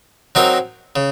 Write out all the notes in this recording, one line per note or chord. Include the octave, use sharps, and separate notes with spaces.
F#3 C4 D#4 A#4
C#3